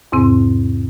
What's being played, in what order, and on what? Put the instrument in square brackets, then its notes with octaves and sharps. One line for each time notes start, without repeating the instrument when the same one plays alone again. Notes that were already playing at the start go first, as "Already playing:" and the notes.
[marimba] E2 G#2 C3 C4